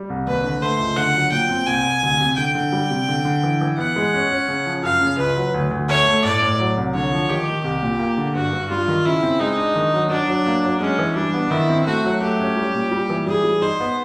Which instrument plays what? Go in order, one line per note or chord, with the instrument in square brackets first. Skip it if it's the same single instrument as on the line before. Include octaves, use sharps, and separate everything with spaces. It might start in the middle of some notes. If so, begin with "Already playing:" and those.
Already playing: [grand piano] G3
C2
[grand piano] D#2 [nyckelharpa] B4
[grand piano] D3
[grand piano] A3 [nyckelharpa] C5
[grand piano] C#2
[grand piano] D3 [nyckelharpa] F#5
[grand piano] F#3
[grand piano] A#2 [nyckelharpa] G5
[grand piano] C4
[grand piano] C2 [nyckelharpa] G#5
[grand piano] C2
D2
C3
[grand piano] D3 [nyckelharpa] G5
[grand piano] D3
G3
C3
D3
D3
E3
E3
[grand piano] B3 [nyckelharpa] F#5
[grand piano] G#3
C#4
C#4
C#3
F3
[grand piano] F#2 [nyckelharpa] F5
[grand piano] C#3
[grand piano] C#2 [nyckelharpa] B4
[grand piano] F#3
D2
D2
[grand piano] A3 [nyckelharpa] C#5
[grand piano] A3
[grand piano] A2 [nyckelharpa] D5
[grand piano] A2
F#3
C2
[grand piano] D3 [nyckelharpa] C#5
[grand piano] F3
[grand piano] D#3 [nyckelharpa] G4
[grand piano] D#3
[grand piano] C2 [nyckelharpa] G4
[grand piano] A#2
A#3
D3
[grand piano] G2 [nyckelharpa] F#4
[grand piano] G2
[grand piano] G3 [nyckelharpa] F4
[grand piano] D#3
[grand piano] C#3 [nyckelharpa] E4
[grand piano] C4
[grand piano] G#3 [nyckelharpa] D#4
[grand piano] D4
D#3
F#3
[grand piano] F#3 [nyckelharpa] D4
[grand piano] F#3
A#3
F#3
[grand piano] G#3 [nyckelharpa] C#4
[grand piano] E3
[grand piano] G3 [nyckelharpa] D4
[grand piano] B3
[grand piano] D#3 [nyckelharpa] E4
[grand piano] C4
[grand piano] A3 [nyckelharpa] F#4
[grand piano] F#3
[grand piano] A3 [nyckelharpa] G4
[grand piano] C#4
G3
A#2
G3
E3
[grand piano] G3 [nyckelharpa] G#4
[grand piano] G3
[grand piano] D#4 [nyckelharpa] C5
[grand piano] B3